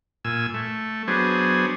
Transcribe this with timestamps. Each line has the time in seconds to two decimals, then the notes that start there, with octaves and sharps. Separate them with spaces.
0.25 A#2 G#5 E6
0.54 A3
1.08 F#3 B3 D4 G#4 C5